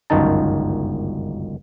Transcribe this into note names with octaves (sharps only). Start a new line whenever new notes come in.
G1 C#2 F#2 D#3 D#4 A5